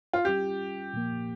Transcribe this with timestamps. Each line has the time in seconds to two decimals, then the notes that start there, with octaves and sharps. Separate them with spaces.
0.14 F4
0.25 G3 C#4 F4 G4
0.93 A#2 F3 A#3